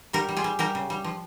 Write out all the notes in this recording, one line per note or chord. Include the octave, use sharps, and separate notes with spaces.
G3 G4 A#4
G3
F4 G#4
G3
G3 G4 A#4
C#3
G3
F3